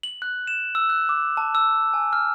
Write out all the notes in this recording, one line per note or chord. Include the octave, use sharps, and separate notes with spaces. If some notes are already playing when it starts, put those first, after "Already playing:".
F#7
F#6
E7
E6
F#6
D6
A5
E6
G#5
F6